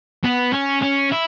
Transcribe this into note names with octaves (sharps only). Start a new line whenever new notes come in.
B3
C#4
C#4
E4